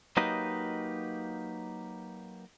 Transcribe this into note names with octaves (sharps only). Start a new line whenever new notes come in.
F#3 A#3 D#4 G4 B4 D#5